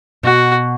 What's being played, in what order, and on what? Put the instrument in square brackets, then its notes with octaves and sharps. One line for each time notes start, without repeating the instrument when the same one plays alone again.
[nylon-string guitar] B2 [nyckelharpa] F#4